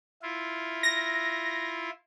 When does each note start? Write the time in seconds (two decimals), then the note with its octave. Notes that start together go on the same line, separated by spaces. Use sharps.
0.22 E4 F4
0.83 A#6